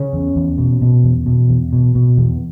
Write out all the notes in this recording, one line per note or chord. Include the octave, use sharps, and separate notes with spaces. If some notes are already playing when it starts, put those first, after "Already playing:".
Already playing: C#3 C#4
E2
E2
B2
B2
E2
B2
E2
B2
B2
E2